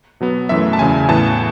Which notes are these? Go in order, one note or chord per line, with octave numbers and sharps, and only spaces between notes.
B2 F#3 B3
F#2 E3 A3 E5
A5
E2 C#3 F#3 G#5
A2 E3 B3 A5